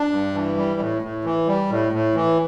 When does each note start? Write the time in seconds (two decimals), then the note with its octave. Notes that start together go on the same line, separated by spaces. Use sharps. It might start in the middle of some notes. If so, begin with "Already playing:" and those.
Already playing: D4
0.11 G2
0.34 E3
0.57 G3
0.80 A2
1.02 A2
1.25 E3
1.47 G3
1.70 A2
1.92 A2
2.15 E3